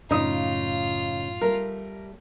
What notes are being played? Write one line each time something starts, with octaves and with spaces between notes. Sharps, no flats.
F#2 A2 C#3 D#4 F4 D#6
G3 A3 A#4